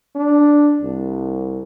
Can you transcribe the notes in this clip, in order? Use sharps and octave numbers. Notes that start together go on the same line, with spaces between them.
D4
C2